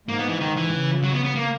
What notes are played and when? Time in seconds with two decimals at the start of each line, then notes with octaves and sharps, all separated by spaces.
0.08 G#2 A#3
0.19 B3
0.29 E3
0.41 D#3
0.56 E3
0.72 C#3
1.04 F#3
1.14 B3
1.25 B3
1.36 A#3